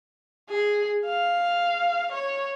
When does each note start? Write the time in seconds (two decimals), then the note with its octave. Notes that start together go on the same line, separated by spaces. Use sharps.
0.50 G#4
1.06 F5
2.12 C#5